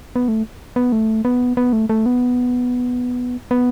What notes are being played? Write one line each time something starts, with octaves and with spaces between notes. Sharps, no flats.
B3
A3
B3
A3
B3
B3
A3
A3
B3
B3